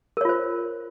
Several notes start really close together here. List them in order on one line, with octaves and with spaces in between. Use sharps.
A#4 C#5 F4 C5